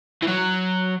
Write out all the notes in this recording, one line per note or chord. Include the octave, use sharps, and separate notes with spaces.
E3
F#3